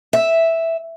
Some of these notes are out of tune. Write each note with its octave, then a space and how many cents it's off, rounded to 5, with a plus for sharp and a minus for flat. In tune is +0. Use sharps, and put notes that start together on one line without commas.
E5 -5